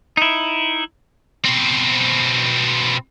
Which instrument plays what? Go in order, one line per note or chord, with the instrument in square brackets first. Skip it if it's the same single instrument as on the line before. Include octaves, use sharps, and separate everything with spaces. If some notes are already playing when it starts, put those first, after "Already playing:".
[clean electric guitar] D#4 E4
[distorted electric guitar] B2 C4